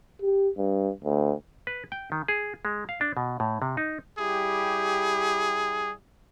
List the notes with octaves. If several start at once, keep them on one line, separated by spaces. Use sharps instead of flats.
G4
G2
D2
B4
G5
D#3
G#4
G#3
F5
D4
B2
A2
C3
D#4
G3 E4 G4 G#4